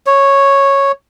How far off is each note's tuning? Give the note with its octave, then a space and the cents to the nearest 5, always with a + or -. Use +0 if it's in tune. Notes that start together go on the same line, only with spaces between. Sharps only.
C#5 -5